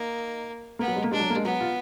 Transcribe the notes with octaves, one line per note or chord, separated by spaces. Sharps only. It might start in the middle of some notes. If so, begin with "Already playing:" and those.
Already playing: A#3 D#4
A#3 B3
F#3
G#3
A#3
G#3 D4
F#3
A#3
G#3
F#3 B3
F4